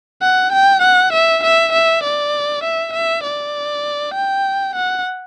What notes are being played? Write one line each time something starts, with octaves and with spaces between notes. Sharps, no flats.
F#5
G5
F#5
E5
E5
E5
D5
E5
E5
D5
G5
F#5